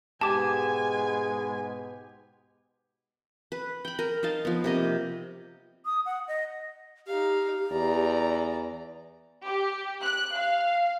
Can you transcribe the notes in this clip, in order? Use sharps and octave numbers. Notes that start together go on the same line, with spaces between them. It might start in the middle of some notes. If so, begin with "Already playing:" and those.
G#2 B2 G#3 G4 G#5 A5 D6
B4
G5 B5
A#4
D#4 C5 F5 A5
F3 B3
C3 A#3 D#5
D#6
F#5
D#5
D#4 G4 F5
E2 D5 A#5
G4
F#6
F5